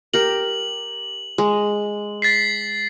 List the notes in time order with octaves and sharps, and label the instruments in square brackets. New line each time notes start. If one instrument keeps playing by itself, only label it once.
[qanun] G4 A#4 [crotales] F#7
[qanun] G#3
[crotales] A6 B6 C7